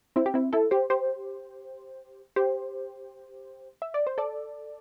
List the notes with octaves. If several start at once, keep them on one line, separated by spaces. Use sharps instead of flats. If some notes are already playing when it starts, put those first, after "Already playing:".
C4 E4
G4
C4 E4
E4 A4
G4 C5
G4 C5
G4 C5
E5
D5
C5
A4 D5